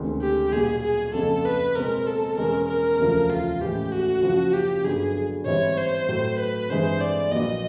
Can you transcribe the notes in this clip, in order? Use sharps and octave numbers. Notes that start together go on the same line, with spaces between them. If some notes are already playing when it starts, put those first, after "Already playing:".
Already playing: D2 C3 D#3 G#3 C#4
G4
B1 A#2 G3 G#4
G#4
F#1 F2 C#3 A4
B4
B2 G#3 C4 A#4
A4
E2 B2 G#3 C#4 A#4
A#4
E1 D2 C#3 F3 A3
F4
A2 E3 G#3 C#4 G4
F#4
F#1 F#2 C#3 F3
G4
G1 G2 D3 F#3 G#4
G#2 E3 G3 C4 E4 C#5
C5
A2 F#3 A3
B4
G2 E3 G#3 C4 C5
D5
A#1 A#2 F#3 B3 D#5